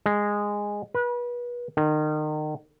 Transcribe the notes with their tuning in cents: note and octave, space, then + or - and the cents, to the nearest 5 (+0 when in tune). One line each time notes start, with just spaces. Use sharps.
G#3 -10
B4 -30
D#3 -30